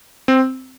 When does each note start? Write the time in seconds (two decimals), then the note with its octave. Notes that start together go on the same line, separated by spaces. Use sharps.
0.28 C4